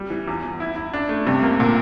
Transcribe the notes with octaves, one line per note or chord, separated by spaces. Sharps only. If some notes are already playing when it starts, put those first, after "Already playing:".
Already playing: G3
E3
E2
E2
E4
E4
D4
A3
G2 C3
A#3
A#2 D3